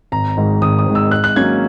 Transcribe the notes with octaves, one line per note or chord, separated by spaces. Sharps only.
G#1 A#5
G#2 D#3 G#3
G#1 D#6
D#6
G#2 D#3 G#3
E6
G#2 F#6
F#6
F#3 A#3 C#4 G#6